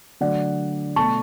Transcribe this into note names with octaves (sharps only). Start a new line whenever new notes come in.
D3 F#3 A3 D5 F#5
B2 A3 A5 C#6